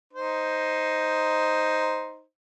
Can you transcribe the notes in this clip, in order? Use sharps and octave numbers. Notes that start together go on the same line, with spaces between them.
D#4 C5